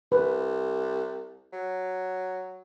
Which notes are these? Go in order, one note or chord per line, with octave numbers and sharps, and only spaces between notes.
C2 B4
F#3